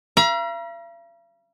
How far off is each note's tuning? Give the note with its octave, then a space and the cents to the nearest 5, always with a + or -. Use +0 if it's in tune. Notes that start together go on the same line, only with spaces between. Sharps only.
F5 -45 A#5 +40